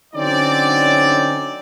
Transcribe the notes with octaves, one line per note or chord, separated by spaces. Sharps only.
D3 F#3 C4 C#4 D#4 D5